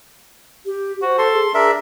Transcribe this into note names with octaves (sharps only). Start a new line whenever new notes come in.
G4
F#4 C5
A4 C6
G#4
D4 G#4 A#4 E5